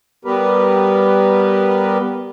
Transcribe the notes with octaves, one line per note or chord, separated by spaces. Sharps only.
G3 B3 G4 A#4 B4